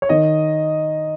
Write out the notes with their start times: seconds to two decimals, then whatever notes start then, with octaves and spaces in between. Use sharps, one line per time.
0.02 C#5
0.09 D#3 D#5